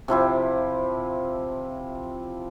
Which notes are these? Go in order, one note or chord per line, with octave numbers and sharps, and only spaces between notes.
C3 F3 E4 G4